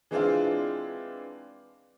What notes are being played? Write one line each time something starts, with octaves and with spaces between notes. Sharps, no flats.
E3 G#3 C4 D4 F4